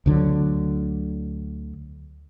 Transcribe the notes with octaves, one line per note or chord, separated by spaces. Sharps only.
D2 D3 E3 F#3